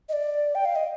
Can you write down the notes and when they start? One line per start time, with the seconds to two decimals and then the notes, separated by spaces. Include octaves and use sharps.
0.09 D#5
0.13 D5
0.55 G5
0.65 F5
0.76 D#5